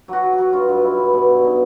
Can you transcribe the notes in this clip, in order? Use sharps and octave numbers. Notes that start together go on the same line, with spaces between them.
F#3 F#4
F#3
F#4
F#3
G2 F4
G2
F#3 E4
G2
B2 D4
B2
B2 D#4